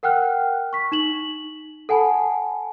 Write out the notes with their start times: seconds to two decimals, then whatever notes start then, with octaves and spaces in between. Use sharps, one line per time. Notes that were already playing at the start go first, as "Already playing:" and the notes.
0.03 A#4 F#5 G5 F6 F#6
0.73 C#6 B6
0.92 D#4 E7 F#7
1.89 A4 F#5 G#5 A5 B5